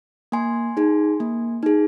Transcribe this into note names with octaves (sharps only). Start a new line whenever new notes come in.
A#3 G#5 C6
D#4 G#4
A#3
D#4 G#4